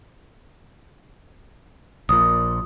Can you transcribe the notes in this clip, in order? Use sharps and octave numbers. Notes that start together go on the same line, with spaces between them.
A#1 A#2 D#6